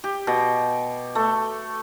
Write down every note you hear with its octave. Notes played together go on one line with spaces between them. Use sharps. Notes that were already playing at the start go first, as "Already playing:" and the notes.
G4
B2
A3